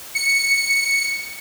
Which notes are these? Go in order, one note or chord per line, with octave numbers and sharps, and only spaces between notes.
C#7